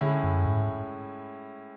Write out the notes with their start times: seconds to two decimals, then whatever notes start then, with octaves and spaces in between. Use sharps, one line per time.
0.01 A2 D3 G#3 C#4 E4
0.24 F#2
0.46 G#2